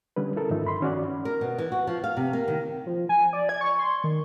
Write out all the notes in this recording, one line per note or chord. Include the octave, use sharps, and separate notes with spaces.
D3 G3 C#4 B4
E4 A4 A#4
G#2 D#3 F3 D#4 F4 E5
G2 B5 C6
D#3 C#4 F#4 D5
A#4
B2
E3
F#4
F3
F5
C3
A#3
D#3
F3
G#5
D5
G#6
C#6
C6
D#3